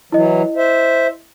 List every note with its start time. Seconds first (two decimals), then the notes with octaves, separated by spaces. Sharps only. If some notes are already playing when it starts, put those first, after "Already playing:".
0.12 E3 F#3 E4 D#5
0.57 C5 E5